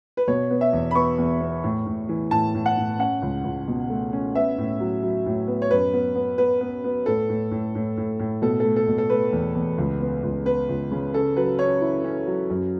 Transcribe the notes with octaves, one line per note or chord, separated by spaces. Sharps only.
B4
B2 C#5
B3
E5
E2
B5
B3 C#6
E2
B3
A2
A2
E3
A2 A5
A2
F#5
A2
C#4 F#5
C#2
C#2
B2
A3
C#4
B3 E5
A2
F#3
F#3
A2
B3
C#5
F#2 B4
B3
B3
B3 B4
B3
B3
A2 A4
A2
A2
A2
A2
A2
B2 A4
A3 A4
A4
B2
A4
A3 B4
E2
E2
C#2
B3
C#2
B3 B4
C#2
C#3
C#4 A4
F#3 B4
C#4 C#5
E4
C#4
F#3
F#2